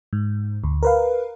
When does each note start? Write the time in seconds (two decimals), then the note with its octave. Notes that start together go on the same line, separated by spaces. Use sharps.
0.13 G#2
0.64 D2
0.83 A#4 B4 F5